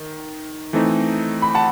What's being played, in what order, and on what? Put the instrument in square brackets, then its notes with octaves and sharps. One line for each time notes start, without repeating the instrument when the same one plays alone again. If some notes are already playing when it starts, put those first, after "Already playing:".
Already playing: [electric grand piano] D#3
E3 A3 C4 D#4
[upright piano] B5
F#5 A5